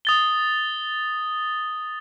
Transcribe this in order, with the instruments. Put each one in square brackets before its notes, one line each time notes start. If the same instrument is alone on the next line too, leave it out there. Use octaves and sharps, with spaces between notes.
[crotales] D#6 A6 G7